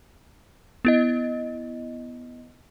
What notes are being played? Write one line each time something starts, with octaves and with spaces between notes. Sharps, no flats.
B3 E4 D#5